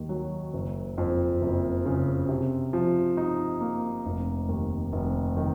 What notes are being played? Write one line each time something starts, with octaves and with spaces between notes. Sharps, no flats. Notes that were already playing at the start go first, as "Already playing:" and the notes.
Already playing: D#2 D#3
F#3
F#1
F2
F#1
C#3
C3
F3
D#4
A#3
F1
D#2
F1
D#3